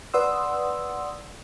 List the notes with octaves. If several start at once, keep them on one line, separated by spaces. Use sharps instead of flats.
B4 D5 F#5 C6 D#6 E6